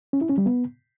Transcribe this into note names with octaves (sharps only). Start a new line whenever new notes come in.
C#4
E4
C#4
G3
B3